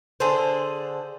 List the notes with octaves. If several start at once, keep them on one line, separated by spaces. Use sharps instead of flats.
D3 G#4 A4 C5